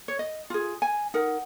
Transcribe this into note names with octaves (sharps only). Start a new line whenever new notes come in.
C#5
D#5
F4 G#4
G#5
D#4 A#4 F#5